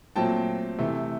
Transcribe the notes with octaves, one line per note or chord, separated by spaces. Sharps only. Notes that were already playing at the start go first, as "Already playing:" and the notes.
A#2 F#3 A3 C4 G5 A5
C3 E3 A3